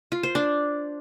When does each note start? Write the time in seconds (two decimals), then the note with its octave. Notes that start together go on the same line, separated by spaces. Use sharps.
0.12 F4
0.23 C5
0.35 D4